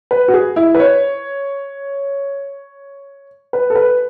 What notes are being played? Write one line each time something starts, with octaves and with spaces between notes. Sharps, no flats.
B4
F#4
G#4
E4
B4
C#5
B4
A4
B4